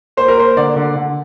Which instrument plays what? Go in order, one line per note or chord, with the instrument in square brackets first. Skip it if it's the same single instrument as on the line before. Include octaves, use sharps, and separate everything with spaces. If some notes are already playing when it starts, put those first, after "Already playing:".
[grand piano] A#3 C5
A#4
A#3 C5
D3 D5
D3
D3